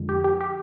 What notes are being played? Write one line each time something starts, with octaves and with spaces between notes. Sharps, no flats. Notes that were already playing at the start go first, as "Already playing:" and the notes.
Already playing: F2 D3 F3 G#3
G4
G4
G4